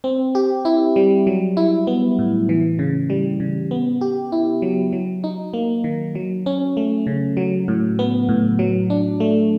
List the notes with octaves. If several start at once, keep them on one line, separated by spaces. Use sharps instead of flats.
C4
G4
E4
G3
F#3
E4
B3
A2
E3
C#3
G3
C#3
B3
G4
E4
F#3
F#3
D#4
A#3
D#3
F#3
C#4
A3
C#3
F#3
A2
B3
A2
F#3
D4
A3